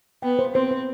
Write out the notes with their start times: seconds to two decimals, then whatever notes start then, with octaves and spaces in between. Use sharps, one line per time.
0.22 B3 G5
0.39 C5
0.55 C4 C5
0.71 C5